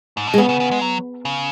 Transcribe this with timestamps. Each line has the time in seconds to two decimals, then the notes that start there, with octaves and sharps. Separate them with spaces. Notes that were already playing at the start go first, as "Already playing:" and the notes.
0.17 G#2
0.27 B2
0.34 G#3
0.38 C#3 B3
0.49 C#3
0.60 C#3
0.71 G#3
0.82 F#3
1.25 C#3